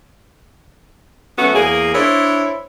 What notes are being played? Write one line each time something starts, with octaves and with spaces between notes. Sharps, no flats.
F#3 A3 B3 C#4 F#4
E2 A#3 G#4
D4 E4 C5 C#5